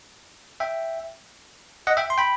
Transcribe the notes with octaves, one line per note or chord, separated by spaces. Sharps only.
E5 G5
D#5 F#5
E5 G5
C6
G5 B5